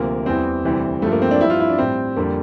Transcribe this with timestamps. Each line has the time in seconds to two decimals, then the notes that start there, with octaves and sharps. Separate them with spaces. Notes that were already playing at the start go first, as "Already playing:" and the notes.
Already playing: D2 C3 F3 A#3
0.26 E2 E3 G3 C4
0.64 D2 C3 E3 G3
1.02 G2 F3 A3
1.12 A#3
1.22 C4
1.31 D4
1.41 G2 F3 E4
1.50 F4
1.60 E4
1.70 D4
1.78 A2 G3 C4
2.16 F2 D3 G3 A#3